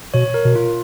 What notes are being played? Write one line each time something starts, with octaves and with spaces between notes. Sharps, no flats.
B2 C#5
A#4
B2
F4